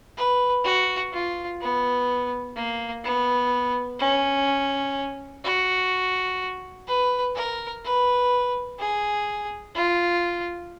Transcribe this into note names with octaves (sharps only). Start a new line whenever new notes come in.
B4
F#4
F4
B3
A#3
B3
C#4
F#4
B4
A#4
B4
G#4
F4